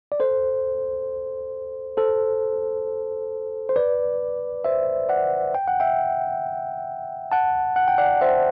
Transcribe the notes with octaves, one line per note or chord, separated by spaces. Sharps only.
D5
A4 C5
A4 C5
C5
B4 D5
C5 E5
D5 F#5
G5
F#5
E5 G5
F#5 A5
F#5
G5
D5 F#5
C5 E5